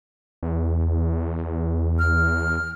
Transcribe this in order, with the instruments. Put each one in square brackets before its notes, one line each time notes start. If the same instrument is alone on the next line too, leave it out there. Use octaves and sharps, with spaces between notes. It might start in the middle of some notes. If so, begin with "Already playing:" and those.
[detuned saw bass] E2
[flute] F6